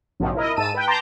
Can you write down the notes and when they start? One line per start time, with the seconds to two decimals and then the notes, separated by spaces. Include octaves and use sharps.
0.20 A#1 G#2 C3 F3 F#3
0.35 E4 A#4 D#5
0.56 G#2 A5 E6 D#7
0.74 B4 G5
0.88 G5 A5 A#5 C6 D6 G6